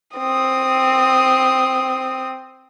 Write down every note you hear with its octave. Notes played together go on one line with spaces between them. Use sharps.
C4 D#6